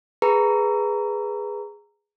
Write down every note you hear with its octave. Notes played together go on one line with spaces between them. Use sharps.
G#4 B4 A#5